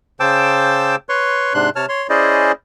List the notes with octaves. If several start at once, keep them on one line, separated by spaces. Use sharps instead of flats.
C#3 C5 G5 A5 D6 E6
B4 C#5 C6 C#6
G#2 C3 D4 C6 F#6
C3 C#5 A5 F6
C#5 C6
C#4 E4 G#4 C5 D5 D#5